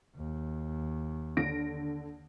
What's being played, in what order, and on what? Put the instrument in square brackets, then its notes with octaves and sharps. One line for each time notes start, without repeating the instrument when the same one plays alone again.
[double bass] D#2
[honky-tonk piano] D3 A#6 D7